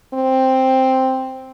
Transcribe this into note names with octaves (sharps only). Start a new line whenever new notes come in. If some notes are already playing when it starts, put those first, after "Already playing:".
C4